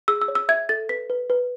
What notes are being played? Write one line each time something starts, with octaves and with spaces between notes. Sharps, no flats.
G#4 E6
E6
C#5
E6
E5 G#6
A4 A6
B4 B6
B4
B4